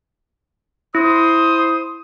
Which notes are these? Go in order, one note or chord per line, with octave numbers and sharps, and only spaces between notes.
E4 C5 D#6